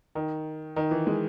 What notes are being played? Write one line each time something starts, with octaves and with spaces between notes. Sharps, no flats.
D#3
D#3
E3
G#3